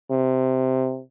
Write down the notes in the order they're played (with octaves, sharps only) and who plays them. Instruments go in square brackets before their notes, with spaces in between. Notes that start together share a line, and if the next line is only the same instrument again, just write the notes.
[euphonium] C3